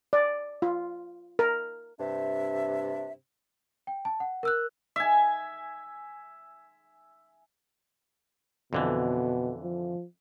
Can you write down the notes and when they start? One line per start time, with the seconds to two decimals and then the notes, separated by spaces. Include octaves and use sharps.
0.13 D5
0.62 F4
1.39 A#4
2.00 G2 C3 D4 E5
3.87 G5
4.05 A5
4.20 F#5
4.43 A#4 E6 F#6
4.96 E5 G#5
8.73 F2 B2 D3 E3
9.63 F3